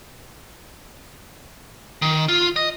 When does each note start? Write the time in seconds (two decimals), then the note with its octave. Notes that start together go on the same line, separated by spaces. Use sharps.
2.02 D#3
2.29 F4
2.56 D#5